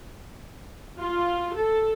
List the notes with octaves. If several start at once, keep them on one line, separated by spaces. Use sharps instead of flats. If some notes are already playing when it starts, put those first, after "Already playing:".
F4
A4